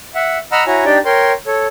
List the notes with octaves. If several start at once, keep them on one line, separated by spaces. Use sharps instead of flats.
E5 F#5
D#5 F#5 A#5 B5 E6 F6
E4 F#4 C#5 G#5 A#5
D4 D#4 G4 D5 G5
A#4 C#5 G5 C6
A4 C#5